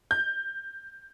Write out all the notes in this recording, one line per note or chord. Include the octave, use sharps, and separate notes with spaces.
G6